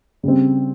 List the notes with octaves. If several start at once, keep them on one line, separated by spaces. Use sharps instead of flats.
C#3 G3 C4